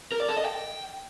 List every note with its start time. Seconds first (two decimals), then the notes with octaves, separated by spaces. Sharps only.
0.12 A#4
0.20 D5
0.28 A4
0.37 D#5
0.45 G5